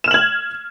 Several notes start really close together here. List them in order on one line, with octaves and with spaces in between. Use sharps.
E7 F6 F#7 G#6